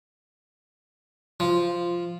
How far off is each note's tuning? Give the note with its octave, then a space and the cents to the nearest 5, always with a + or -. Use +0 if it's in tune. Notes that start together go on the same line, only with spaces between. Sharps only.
F3 -5